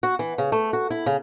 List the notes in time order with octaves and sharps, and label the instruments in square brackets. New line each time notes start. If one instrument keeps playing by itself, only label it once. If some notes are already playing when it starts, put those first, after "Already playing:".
[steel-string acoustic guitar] F#4
E3
C#3
A3
F#4
E4
C#3